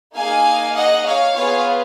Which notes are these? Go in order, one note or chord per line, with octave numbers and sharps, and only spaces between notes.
A#3 D#4 G#4 F5 G#5
D#5 F#5
C#5 F5
B3 F4 G#4 C#5 F5